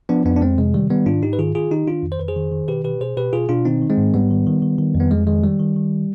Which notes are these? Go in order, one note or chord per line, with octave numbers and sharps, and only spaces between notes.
F3 B3 D4
F2 B3 D4
D4
F2 G#3 C4
C3 G#3
D#3 G3
D#3 G3 B3
G#2 D4 F4
G#2 D#4 G4
B4
D#3 F4 G#4
D#3 F4 G#4
D#3 D#4 G4
D#3 D4 F4
F2
C5
F2 B4
G#4 C5
D#3
D#3
B2 G4 B4
B2 G4 B4
B2 G#4 C5
B2 G4 B4
B2 F4 G#4
B2 D4 F4
D#3 C4 D#4
D#3
G#3 C4
G#2
G#2 G3 B3
D#3
D#3
D#3
D#3
F2
B3
F2 G#3
D#3 G#3
D#3 G3
D#3
D#3